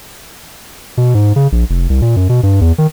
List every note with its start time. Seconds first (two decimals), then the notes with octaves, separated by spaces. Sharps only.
0.97 B2
1.14 G#2
1.36 C#3
1.52 A#1
1.70 F1
1.90 C2
2.02 A#2
2.16 F#2
2.29 B2
2.43 G2
2.61 E2
2.78 D#3